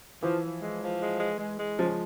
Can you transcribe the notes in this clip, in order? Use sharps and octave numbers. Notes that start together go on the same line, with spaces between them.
E3 F3
F3
G#3
F3
G#3
G#3
G#3
G#3
C#3 F3